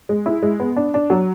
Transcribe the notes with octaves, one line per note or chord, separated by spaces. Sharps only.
G#3
E4
G#3
B3
D4
D4
F#3